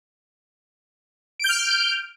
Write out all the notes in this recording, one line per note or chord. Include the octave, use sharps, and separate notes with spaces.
F6 G6 D7